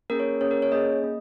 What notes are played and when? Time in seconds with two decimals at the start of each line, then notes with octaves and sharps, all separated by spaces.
0.10 A#3 C#4 G#4 A#4
0.20 C#5
0.41 A#3 C#4 G#4 C#5
0.51 A#4
0.62 C#5
0.72 A#3 C#4 G#4 D#5
1.04 A#3